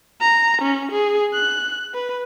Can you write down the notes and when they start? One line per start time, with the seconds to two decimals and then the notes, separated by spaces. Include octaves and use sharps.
0.21 A#5
0.62 C#4
0.92 G#4
1.34 F#6
1.94 B4